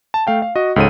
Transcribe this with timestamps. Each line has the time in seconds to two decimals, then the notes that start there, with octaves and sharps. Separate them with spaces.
0.14 A5
0.27 A3 F5 G5
0.42 F5
0.56 F#4 D#5
0.76 C#2 G#2 A4 C#5 D#7